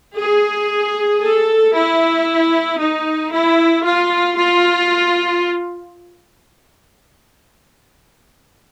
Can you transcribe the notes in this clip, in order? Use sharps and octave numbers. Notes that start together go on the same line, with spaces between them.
G#4
A4
E4
D#4
E4
F4
F4